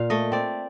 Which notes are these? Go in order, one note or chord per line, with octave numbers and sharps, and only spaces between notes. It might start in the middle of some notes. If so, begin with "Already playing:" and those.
Already playing: A#2 F5
A3 D#5
C4 D5